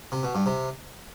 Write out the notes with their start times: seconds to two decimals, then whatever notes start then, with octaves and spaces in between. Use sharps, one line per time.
0.12 C3
0.23 B2
0.35 G2
0.46 C3